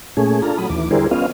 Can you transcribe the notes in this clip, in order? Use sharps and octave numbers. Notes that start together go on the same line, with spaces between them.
A#2 A3 C#4 G#4
D4 F4 A4 A#5
F#3 B5 D#6
D#2 E3 D6
D3 G3 E4 G#4 A#4 C5
B3 C#4 F4 D#5 F5